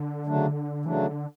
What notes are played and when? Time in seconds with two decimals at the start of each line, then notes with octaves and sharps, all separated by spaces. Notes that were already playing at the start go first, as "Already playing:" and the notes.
Already playing: D3
0.26 C#3 F#3 A3 D4
0.85 C#3 E3 F#3 A3 D4
1.06 D3